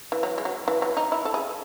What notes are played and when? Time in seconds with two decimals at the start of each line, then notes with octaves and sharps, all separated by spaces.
0.12 E3
0.23 F#3
0.38 G#3
0.45 F#3
0.68 E3
0.82 F#3
0.97 D#4
1.12 E4
1.25 A4
1.34 G#4